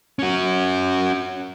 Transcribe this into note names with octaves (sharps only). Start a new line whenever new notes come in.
C#4 F#4